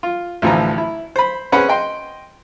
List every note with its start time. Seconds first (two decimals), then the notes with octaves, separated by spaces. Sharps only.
0.03 F4
0.42 A1 D2 E3 F3 F4 A#5
0.78 E4
1.16 C5 B5
1.52 C4 C#4 G#4 B4 F#5 B5
1.69 D#5 G5 C6